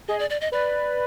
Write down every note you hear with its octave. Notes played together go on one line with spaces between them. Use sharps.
G#4 D#5
D5
D5
D#5
B4 D5